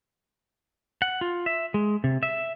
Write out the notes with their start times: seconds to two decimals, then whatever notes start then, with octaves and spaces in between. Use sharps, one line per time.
1.02 F#5
1.21 F4
1.46 E5
1.74 G#3
2.04 C3
2.23 E5